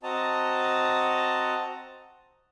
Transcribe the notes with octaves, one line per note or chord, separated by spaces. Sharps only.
C4 F#4 D#5 A5 A#5